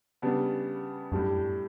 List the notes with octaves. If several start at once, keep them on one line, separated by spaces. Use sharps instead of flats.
C#3 G3 B3 D4
F#2 A2 G3 D4